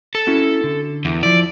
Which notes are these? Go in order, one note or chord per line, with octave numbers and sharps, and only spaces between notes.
A4
C#4 E4 F#4
D3
E2
F3 E4 D5